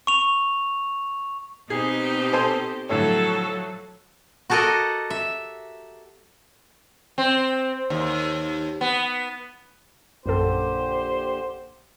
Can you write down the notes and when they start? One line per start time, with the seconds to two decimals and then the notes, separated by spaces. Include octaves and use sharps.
0.07 C#6 F7
1.70 B2 C4 D#4 G4 G#4
2.33 A4 C5 G#5
2.89 A2 D3 F3 F#3 A4 C#5
4.50 F#4 G4 A4 A#4 D#5 F#5
5.10 E5
7.18 C4
7.90 D#2
8.81 B3
10.26 A#1 F#2 A#2 D3 G4 A4 C5